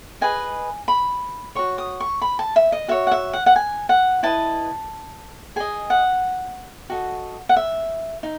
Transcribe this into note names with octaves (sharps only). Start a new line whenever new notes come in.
G#4 B4 D#5 G#5
B5
F#4 C#5 C#6
D#6
C#6
B5
A5
E5
D#5
F#4 C#5 E5
F#5
E5
F#5
F#5
G#5
F#5
E4 B4 D#5 A5
G#4 D#5 G#5
F#5
F#4 A4 D#5
F#5
E5
D#4